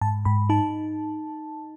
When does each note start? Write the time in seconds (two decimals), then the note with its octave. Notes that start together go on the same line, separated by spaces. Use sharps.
0.01 G#2 A5
0.25 G#2 B5
0.50 D#4 A5